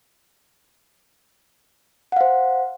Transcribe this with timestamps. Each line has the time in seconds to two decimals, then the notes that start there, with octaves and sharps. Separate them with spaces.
2.12 F#5
2.17 F5
2.21 C5